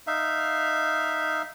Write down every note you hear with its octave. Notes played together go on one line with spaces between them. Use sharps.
D#4 E5 F5